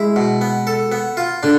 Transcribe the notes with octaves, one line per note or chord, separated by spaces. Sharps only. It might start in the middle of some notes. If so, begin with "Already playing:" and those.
Already playing: G#3 E4
B2
B3
A4
B3
F4
D3 D4